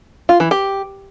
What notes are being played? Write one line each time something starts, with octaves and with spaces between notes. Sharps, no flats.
F4
E3
G4